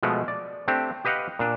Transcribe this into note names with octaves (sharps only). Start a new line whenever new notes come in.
B2 F3 G#3 A3
D5
A3 C4 D4 G4
G4 B4 D#5 F5 F#5
A#2 D4